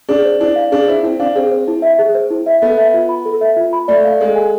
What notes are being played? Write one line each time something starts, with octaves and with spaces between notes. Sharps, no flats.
D4 G#4
C5
D4 E4
F5
D4 G#4
E4 C5
C4 E4
D4 F5
C4 G#4
C5
E4
E5
G#4
C5
E4
E5
B3 A4
E5
F4
B5
A4
E5
F4
B5
A3 D5
F5
G#3 A4
G#5